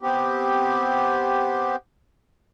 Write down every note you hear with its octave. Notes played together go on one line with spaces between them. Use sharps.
B3 C4 G4